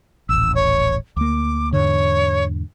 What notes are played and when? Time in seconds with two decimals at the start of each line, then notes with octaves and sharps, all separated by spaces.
0.29 D#1 A1 E6
0.55 C#5
1.16 D2 A#3 D6
1.73 E2 G#2 D3 C#5